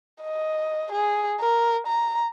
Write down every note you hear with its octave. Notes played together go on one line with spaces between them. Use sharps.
D#5
G#4
A#4
A#5